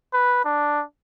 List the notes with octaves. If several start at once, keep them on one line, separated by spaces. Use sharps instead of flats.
B4
D4